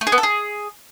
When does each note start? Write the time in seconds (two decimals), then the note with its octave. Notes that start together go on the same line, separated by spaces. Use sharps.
0.01 A3
0.07 G#4
0.12 B3
0.18 A4
0.23 G#4